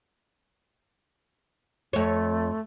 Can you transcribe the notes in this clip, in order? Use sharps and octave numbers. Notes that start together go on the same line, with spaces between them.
F2 A3 C#5